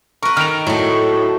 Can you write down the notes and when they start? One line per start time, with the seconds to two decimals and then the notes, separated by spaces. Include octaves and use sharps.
0.23 A#4 B4 C#6
0.37 D#3 F6 D7 F7
0.67 A2 F#3 A3